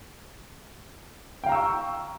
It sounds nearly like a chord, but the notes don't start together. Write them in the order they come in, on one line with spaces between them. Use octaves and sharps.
G5 F5 A#5 E6 C#6